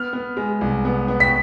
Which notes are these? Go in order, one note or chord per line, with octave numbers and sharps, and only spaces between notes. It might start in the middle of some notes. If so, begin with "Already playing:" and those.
Already playing: B3 F6
B3
G#3
C2
B3
B3
B6